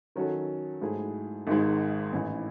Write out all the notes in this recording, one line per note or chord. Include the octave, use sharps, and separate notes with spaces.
D#3 F#3 C#4 F#4 A4
G#2 F#3 A3 E4 G#4
G#1 G#2 D#3 G#3
A1 A2 E3